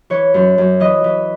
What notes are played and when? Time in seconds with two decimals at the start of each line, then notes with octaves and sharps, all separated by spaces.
0.10 E3 C#5
0.34 F#2
0.58 F#2
0.80 E3 D#5
1.04 E3